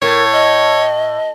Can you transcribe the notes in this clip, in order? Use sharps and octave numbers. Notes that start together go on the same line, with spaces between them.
A2 A#4 C#5
D#5